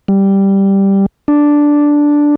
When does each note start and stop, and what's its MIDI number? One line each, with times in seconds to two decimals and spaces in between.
0.08 1.06 55
1.28 2.35 62